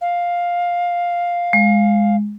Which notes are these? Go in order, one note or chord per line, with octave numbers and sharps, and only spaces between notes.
F5
G#3